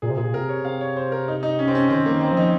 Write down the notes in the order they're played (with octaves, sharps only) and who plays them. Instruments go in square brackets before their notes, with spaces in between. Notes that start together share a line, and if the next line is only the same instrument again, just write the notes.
[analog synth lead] A#2 [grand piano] G#4
[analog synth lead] C3
[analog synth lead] A#2 [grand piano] G#4
[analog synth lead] C3 [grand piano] A#4
[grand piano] C#5
[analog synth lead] C3 [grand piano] F5
[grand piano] C#5
C5
A#4
D#4
D#4
C#4
C4
C#4
[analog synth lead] D#3 [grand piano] C4
[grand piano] A#3
[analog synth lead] D#3
[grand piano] C4
[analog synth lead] F3 [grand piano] D#4